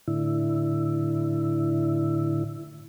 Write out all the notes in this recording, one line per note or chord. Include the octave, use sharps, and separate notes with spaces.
A2 D3 E4